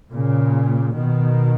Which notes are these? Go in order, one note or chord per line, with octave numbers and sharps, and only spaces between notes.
A#2 C#3
B2 D#3